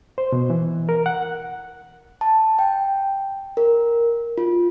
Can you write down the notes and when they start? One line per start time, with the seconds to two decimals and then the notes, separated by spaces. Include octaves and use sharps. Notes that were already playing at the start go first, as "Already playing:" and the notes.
0.18 C5
0.32 B2
0.50 E3
0.89 A#4
1.06 F#5
2.21 A5
2.59 G5
3.57 A#4
4.38 F4